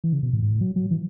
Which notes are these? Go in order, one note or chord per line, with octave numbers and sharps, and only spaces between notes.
E3
C#3
B2
A2
G#2
A2
F#3
F#3
E3